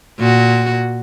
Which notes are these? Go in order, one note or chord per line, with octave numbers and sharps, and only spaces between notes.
A#2 F#4